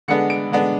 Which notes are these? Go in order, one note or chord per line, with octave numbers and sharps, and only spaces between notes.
D3 G#3 B3 D4 C#7
D7
D3 G#3 B3 D4